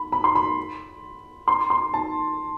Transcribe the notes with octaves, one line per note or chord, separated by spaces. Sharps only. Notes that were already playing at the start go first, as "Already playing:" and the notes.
Already playing: B5
B5
C6
B5
C6
C6
A5